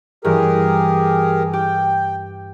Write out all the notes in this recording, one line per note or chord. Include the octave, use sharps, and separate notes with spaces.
G2 E3 G4 G#4 A#4
G4 G5